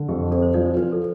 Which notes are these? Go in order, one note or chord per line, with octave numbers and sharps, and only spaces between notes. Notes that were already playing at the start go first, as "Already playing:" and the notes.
Already playing: D3
F2 G4
C4 A4
C5
F3 D4 D5
C5
F3 B4
A4